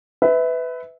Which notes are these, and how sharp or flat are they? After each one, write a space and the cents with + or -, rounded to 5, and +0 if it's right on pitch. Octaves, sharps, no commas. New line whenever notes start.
B4 +20 E5 -20